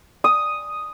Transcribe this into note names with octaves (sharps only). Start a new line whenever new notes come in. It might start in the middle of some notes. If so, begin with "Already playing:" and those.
D#6